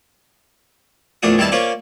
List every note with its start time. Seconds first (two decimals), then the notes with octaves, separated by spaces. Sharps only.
1.23 A#1 E2 A3 D4 D#6
1.38 E2 D#3 G3 C4 E4 A5
1.52 A#3 C#4 F4 C5 D5